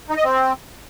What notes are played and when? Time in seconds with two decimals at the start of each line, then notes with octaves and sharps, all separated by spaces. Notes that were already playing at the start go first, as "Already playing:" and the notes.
0.10 D#4
0.17 D#5
0.24 C4